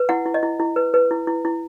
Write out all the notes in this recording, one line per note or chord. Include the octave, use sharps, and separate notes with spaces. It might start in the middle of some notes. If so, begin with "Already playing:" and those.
Already playing: B4
E4 F#5
E4
D#5
E4
E4
B4
B4
E4
E4
E4